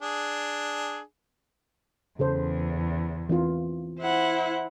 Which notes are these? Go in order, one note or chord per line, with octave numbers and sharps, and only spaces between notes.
D4 G#4
E2 C#3 A4 C5
E3 C4 F4
E4 C5 F#5